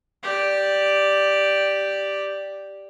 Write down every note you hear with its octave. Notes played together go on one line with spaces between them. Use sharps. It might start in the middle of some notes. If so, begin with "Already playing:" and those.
G4 D5